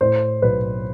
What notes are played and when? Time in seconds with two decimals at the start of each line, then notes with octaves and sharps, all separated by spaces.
0.01 A2 C5
0.42 B1 B4